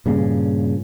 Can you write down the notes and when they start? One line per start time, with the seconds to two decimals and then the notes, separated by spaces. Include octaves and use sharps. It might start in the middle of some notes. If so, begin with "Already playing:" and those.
0.06 G2 A#2 C#3